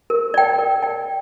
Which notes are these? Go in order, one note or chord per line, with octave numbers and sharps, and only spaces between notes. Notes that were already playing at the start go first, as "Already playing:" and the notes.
A#4
D5 G5
A#4
D5 G5